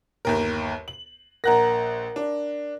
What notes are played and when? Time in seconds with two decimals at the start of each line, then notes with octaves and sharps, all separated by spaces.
0.25 G1 D#2 A#4
0.88 F#7
1.44 A#1 A#4 F#5 A#5 F#6 A#6
2.16 D4